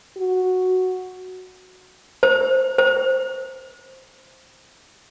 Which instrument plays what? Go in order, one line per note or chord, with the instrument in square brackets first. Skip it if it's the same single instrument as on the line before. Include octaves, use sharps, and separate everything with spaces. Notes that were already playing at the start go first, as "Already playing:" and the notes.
[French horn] F#4
[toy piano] C5
C5